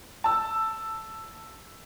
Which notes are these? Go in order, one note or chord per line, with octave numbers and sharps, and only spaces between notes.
A5 E6